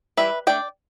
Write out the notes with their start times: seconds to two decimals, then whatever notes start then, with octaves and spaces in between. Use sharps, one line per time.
0.17 E3 G3 E4 B4 E5
0.47 A3 D4 D5 G5